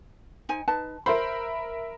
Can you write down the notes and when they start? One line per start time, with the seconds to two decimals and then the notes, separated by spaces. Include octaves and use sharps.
0.49 D#4 C5 G#5
0.68 D#4 B4 A5
1.06 A#4 C5 E5 B5